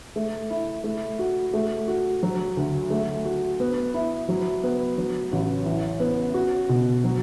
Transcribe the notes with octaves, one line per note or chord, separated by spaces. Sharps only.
A3
E4
A3
F#4
A3
F#4
F#3
D2
A3
F#4
B3
E4
F#3
B3
F#3
A1
E3
B3
F#4
B2
F#3